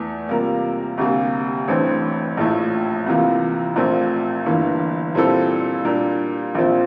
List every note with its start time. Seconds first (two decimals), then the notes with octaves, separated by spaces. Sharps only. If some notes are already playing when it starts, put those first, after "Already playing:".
Already playing: E2 E3 A3
0.29 C3 G3 A#3 F4 A#4
0.98 D2 C3 G3 A#3
1.68 A1 G2 E3 A3 C4
2.37 A#1 A2 F3 A3
3.06 C2 C3 E3 A#3 F4
3.76 A#1 A#2 A3 C4
4.46 G1 G2 E3 A#3
5.15 A#2 G3 C4 E4 A4
5.85 A#2 G3 D4 G4 A#4
6.55 A#1 A#2 F3 C4